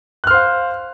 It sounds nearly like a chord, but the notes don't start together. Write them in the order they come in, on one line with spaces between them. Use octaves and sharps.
F#6 F6 C5 F5